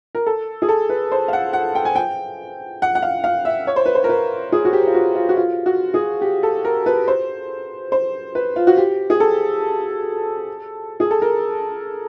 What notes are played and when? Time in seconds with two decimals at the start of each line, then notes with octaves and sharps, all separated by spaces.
0.15 A#4
0.27 A4
0.62 G#4
0.69 A4
0.89 B4
1.12 C5
1.28 F5
1.33 F#5
1.53 F#5
1.75 G5
1.85 G#5
1.95 G5
2.82 F#5
2.95 F#5
3.02 F5
3.24 F5
3.45 E5
3.67 C#5
3.76 C5
3.86 B4
3.95 C5
4.04 A#4
4.09 B4
4.52 G#4
4.65 F#4
4.73 G4
4.87 F4
4.94 F#4
5.15 F4
5.29 F#4
5.36 F4
5.66 F#4
5.94 G#4
6.21 G4
6.43 A4
6.65 A#4
6.86 B4
7.08 C5
7.92 C5
8.35 B4
8.56 F4
8.67 F#4
8.77 G4
9.10 G#4
9.20 A4
11.00 G#4
11.11 A4
11.22 A#4